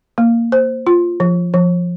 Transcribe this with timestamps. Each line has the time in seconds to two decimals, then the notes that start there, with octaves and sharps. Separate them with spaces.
0.18 A#3
0.52 C5
0.87 F4
1.20 F3
1.54 F3